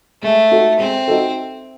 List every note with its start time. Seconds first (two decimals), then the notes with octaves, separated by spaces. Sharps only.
0.22 G#3 A3
0.51 D#4 F#4 A4
0.79 G#3 C4
1.08 D#4 F#4 A4